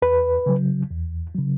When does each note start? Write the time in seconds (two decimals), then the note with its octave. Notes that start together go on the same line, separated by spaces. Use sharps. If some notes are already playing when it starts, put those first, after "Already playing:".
0.02 E2 B4
0.46 C#3 F#3
0.91 E2
1.35 C#3 F#3